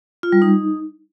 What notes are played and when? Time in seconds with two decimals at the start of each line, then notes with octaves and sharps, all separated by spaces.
0.23 F4
0.32 G3
0.42 D#4